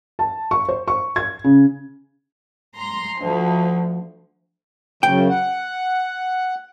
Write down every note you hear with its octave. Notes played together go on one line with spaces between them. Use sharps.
A5
C#6
C5
C#6
G#6
C#3
A#5 C6
D2 F3
F#2 C#3 G5
F#5